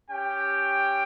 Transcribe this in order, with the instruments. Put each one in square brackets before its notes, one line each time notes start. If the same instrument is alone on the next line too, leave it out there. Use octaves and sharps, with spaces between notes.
[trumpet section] C#4 G4 G5